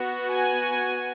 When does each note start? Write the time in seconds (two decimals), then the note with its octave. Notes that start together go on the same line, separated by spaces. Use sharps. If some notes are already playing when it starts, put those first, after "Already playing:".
Already playing: B3 F#4
0.31 G#5